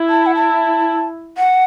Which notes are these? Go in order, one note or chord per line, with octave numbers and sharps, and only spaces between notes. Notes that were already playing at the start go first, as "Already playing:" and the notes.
Already playing: E4
A5
F#5
A5
F#5